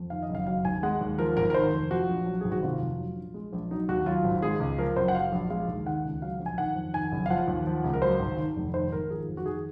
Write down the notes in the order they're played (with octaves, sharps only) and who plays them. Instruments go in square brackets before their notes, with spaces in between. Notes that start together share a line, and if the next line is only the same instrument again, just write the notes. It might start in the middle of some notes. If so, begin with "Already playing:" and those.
Already playing: [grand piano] F2
D#3 F5
D#5
F#1
F5
F#3 F5
D#2 G#5
G#3 F#5
D#2
F3 A#4
G#1 A#4
A#4
D#3 C5
F1
F3 F#4
A#1
F#3
G#1 G#4
F#4
C3 F4
F1
F#3
A#1
G#3
A#1
F#3 D#4
D#2 F#4
F#3 F4
G#1
G#3 G#4
C#2
F3 A#4
F#1 C5
F#5
F#3 F5
A#1
G#3 F5
D#2
D#3 F#5
C#2
F#3 F5
A#1
G#5
D#3 F#5
F2
D#3 G#5
F#1
F5
F3 F#5
D#2
F3
C#2
A#4
F#3 C5
G#1
D#3
F1
D#3 C5
G#1 A#4
F3 G#4
F2
F#4
D#3 G#4